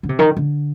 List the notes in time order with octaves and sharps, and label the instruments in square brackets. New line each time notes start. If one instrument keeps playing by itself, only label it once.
[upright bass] D3
C3
D#3
D3